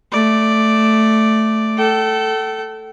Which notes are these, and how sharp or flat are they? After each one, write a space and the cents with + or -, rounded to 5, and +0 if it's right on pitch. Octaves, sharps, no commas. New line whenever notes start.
A3 +0 D5 +0
A4 +0 G5 -40